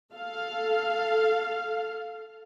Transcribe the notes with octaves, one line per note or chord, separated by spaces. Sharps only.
A4 F5